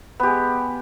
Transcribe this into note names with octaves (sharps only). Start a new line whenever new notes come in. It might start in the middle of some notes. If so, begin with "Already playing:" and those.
G#3 B3 G4